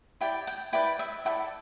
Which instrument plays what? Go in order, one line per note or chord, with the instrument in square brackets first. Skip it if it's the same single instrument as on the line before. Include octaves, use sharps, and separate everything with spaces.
[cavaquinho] E4 G4 D5 G5
G5
E4 B4 D5 G5
E5
E4 A4 D5 G5